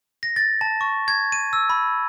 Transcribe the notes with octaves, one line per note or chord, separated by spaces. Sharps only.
A#6
A6
A5
C#6
G#6
D#7
E6
B5